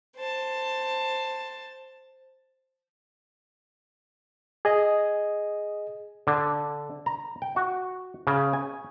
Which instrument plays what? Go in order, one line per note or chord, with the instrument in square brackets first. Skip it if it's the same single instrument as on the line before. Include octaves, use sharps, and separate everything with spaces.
[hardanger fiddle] C5 A5
[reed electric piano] G#4 D#5
[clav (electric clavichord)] D3
A#5
G5
F#4
C#3
G#5